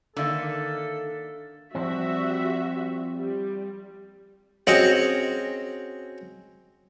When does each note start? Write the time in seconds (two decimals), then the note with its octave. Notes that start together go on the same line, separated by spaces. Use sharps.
0.16 D3 D#3 A#3 A4 A#4 E5 F5
1.75 F3 G3 C4 F#4 E5
3.17 G3
4.67 C4 C#4 F#4 G#4 D#5 F#5